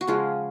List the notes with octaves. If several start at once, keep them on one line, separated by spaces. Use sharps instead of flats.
F#4
C#3 F3 G#3 F4